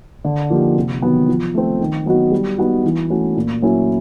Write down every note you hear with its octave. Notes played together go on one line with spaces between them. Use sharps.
D3
F3 A#3 D#4 G4
C3
D#3 F#3 B3
F3
A3 C4
D#3
F#3 B3 D#4 F#4
G3
B3 D#4 F#4
E3
A3 C#4 F#4
A#2
F#3 A#3 C#4 E4